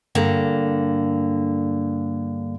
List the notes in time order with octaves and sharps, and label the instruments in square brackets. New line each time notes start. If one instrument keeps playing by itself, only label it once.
[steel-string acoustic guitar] G2 D3 A#3